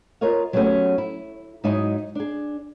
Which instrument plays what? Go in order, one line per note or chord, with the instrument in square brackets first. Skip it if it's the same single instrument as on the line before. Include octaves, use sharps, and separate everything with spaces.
[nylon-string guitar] F4 A#4 C#5 D#5 F5
F#3 G3 A3 B3 C#4 G4
E4
G#2 F#3 D#4 E4 D#5 G#5
D4 G#4